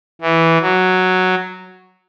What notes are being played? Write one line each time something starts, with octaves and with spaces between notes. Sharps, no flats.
E3
F#3